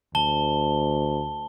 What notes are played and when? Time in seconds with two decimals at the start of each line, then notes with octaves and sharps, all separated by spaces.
0.15 D2 A5 G7